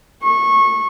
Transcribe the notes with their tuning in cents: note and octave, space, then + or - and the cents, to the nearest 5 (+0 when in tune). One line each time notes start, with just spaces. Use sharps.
C#6 -20